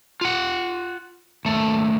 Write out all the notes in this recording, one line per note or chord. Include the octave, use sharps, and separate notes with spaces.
F4 F#5
D#2 A3